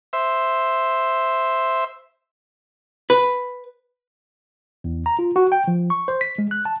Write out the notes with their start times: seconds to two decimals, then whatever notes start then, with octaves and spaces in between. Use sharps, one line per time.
0.13 C5 E5
3.10 B4
4.84 E2
5.06 A#5
5.19 F4
5.36 F#4
5.52 G5
5.67 F3
5.90 C#6
6.08 C5
6.21 B6
6.38 G#3
6.51 F#6
6.65 A5